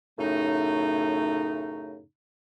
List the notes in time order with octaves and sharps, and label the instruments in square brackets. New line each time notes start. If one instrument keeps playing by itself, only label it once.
[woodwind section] F#2 A2 C#3 A3 D#4